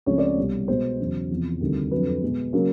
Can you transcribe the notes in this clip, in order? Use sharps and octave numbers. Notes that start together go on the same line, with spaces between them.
C#2 C#3 F3 A3 C4 C#5
D5
C#5
C2 B2 G3
B2 G#3 B3 C5
E2 C#3 F#3
E2 C3 F3
D2 C3 D#3 G3
F2 D3 F#3 B4
B2 G#3 B3
C#3 F#3 A#3